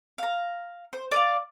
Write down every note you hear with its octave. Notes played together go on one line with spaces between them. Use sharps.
F5 A#5
C5
D5 D#5 F5